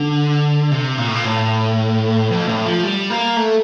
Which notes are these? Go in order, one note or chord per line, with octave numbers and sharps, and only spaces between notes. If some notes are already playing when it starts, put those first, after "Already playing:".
Already playing: D3
C3
A#2
A2
A#2
A2
F2
A2
F3
G3
A#3
A3